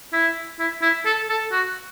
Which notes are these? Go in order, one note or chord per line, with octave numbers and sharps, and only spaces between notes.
E4
E4
E4
A4
A4
F#4